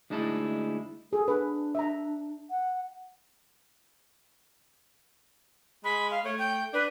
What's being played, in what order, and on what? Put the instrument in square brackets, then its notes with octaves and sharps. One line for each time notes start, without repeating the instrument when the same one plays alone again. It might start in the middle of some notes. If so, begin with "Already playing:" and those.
[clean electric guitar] D2 G#3 D#4 E4 A5
[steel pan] G#4 [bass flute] A4
[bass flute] D4 [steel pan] B4
[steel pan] E5 A#5
[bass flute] F#5
[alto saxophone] G#3 [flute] B5
[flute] F5
[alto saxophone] A3 [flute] C#5
[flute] G5
[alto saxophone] D4 [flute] B4